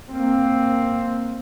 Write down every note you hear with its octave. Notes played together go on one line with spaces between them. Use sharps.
A#3 C4